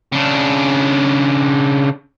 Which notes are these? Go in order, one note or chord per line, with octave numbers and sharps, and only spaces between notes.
C#3 D4